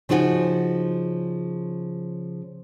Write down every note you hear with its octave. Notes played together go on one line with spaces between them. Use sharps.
C#3 F3 D#4 F#4 F#5 G#5